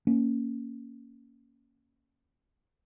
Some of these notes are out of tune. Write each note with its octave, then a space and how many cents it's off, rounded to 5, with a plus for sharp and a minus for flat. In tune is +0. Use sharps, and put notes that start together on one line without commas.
A#3 -5 C#4 +0